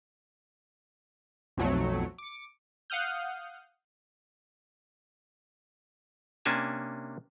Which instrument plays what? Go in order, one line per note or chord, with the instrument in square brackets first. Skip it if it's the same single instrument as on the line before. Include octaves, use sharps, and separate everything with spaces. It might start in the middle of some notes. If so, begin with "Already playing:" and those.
[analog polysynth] B1 F2 F#3 A3 C#7
D6 C#7
[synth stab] F5 F#5 D#6 F6 G6
[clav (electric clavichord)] C3 A#3 C#4 D4 G#5 A5